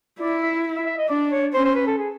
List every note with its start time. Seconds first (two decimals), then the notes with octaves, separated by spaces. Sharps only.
0.20 E4 D5
0.42 E5
0.76 E5
0.86 E5
0.98 D#5
1.09 D4 D5
1.32 C#5
1.53 C#4 C5
1.65 C5
1.75 B4
1.87 A4
1.98 G#4